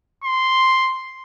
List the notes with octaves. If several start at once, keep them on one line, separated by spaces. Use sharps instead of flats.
C6